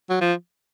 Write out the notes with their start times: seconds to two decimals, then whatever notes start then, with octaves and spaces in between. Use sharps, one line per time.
0.10 F#3
0.21 F3